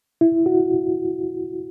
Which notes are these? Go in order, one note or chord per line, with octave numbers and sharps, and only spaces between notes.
E4
F#4